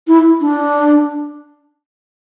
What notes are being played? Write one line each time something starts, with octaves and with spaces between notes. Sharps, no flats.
E4
D4